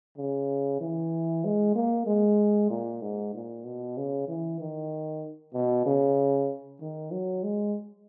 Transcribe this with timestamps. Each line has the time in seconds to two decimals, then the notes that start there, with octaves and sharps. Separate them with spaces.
0.18 C#3
0.81 E3
1.45 G#3
1.76 A#3
2.07 G#3
2.70 A#2
3.02 G#2
3.34 A#2
3.65 B2
3.97 C#3
4.28 E3
4.60 D#3
5.54 B2
5.86 C#3
6.81 D#3
7.12 F#3
7.43 G#3